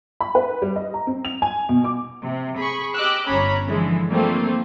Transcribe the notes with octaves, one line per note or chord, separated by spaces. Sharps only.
B5
B4
G3
D#5
A#5
C4
F7
G#5
B2
D6
C3
G#4 B5 C#6
G4 D#5 D6 E6 F#6
G1 C#4 C#5 A#5 B5
D3 E3 F3 G#3
G3 A3 A#3 C4 F4